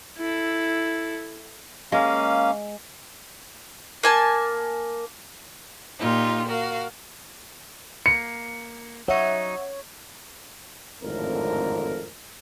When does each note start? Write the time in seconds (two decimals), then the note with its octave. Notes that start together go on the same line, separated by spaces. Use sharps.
0.18 E4 A4
1.92 G#3 A#3 C#4 F5
4.03 A#3 G#5 A5
5.99 A#2 D#4 F4 G4
6.46 F#4 A#4 F5
8.06 A#3 C#7
9.08 F#3 D#4 C#5 E5 F#5
11.02 G#1 F2 A2 D3 A#4